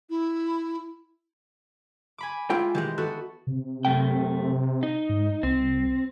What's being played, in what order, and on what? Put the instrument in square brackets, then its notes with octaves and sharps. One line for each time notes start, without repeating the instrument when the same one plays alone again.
[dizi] E4
[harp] G#5 B5 D6
[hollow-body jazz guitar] G#3 F4 G5 [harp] E4
[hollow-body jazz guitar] D#3 E3 G#3 [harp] G4
[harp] B3 F#4 A4
[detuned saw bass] C3
[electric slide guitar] F#2 A3 G5
D#4
[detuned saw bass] G#2
[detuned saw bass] C2 [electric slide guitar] C4